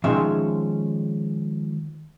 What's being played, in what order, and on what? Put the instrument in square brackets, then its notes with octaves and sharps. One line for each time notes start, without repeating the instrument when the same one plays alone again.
[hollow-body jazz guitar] D#3 F3 G#3 C#4 E5 F5